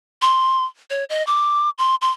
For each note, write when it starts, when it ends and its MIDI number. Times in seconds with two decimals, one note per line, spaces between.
0.22 0.65 84
0.90 1.04 73
1.10 1.25 75
1.27 1.70 86
1.78 1.95 84
2.02 2.11 84